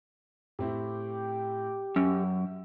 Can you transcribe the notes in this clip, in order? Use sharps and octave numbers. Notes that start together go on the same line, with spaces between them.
A2 C4 E4 G4
F#2 C#4 E6